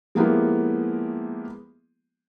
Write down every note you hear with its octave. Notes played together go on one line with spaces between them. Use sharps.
F3 G#3 A#3 B3 E4 G4